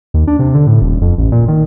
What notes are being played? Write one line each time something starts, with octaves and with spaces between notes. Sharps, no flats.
D#2
D4
C3
D3
A2
D#1
F2
A1
A#2
D#3